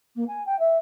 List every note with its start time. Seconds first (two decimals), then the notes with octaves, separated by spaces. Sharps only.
0.16 A#3
0.28 G#5
0.46 G5
0.59 E5